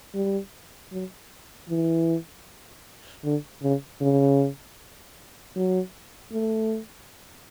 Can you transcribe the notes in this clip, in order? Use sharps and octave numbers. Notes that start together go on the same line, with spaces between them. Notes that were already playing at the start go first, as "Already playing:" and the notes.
G3
F#3
E3
D3
C#3
C#3
F#3
A3